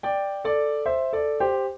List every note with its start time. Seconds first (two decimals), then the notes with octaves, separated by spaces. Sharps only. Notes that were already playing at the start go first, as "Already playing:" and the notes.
0.03 D5 G5
0.44 A4 D5
0.86 C5 E5
1.13 A4 D5
1.40 G4 C5